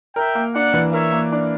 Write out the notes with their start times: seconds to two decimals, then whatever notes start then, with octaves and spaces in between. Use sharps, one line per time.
0.16 A#4 E5 G5
0.35 A#3
0.55 D4 D5 F#5
0.74 E3
0.93 A#4 C#5 E5
1.13 A#3
1.32 D4